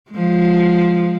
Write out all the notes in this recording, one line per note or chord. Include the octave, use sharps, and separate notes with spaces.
F3 G#3